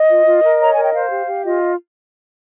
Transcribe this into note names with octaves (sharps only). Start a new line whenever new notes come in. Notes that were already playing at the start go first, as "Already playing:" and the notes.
Already playing: D#5
F4
F4
A#4
C#5 A#5
A#4 G#5
G5
C5 F5
G4
G4
F4 D#5